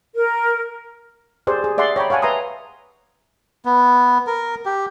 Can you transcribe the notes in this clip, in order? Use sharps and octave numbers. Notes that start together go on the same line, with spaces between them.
A#4
G4 G#4 C5 D5
G#4
G#4 D5 E5 F#5 C6
C#5 G5 A#5 B5
C#5 F5 F#5 G#5 A5
B4 E5 A#5 C6 D#6
B3
A#4
G4